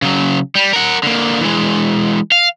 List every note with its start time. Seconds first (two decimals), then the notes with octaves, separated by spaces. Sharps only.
0.02 C#3 F#3
0.55 G3
0.73 A#4 F#5
1.03 D3 A#3
1.41 E3 G#3
2.32 F5